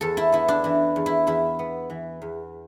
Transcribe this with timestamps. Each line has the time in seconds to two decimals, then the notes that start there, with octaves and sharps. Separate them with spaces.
0.01 E2 A4
0.17 E4
0.32 B3 E4
0.48 D4
0.64 E3 E4
0.96 E2
1.06 E4
1.27 E2 E4
1.59 B3
1.90 E3
2.22 E2